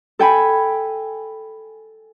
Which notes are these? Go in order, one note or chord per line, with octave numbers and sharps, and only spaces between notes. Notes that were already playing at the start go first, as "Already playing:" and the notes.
A4 G5 G#5 B5